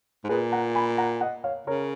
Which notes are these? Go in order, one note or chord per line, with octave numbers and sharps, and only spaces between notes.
G#2
A#2 G#4 B4
F#5 A#5
G#5 B5
F#5 A#5
D#5 F#5
C#5 F5
C#3 A#4 C#5